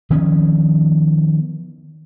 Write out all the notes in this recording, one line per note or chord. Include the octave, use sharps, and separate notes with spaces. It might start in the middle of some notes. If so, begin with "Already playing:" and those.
D#3 F3 B3 C#4